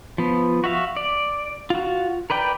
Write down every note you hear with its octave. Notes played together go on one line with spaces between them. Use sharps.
F3 B3
F#4 E5 F5
D5
F4 F#4
A#4 B4 D5 G5